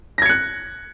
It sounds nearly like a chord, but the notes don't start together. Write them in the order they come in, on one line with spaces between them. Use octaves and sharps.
A#6 G#6 C#7 F#6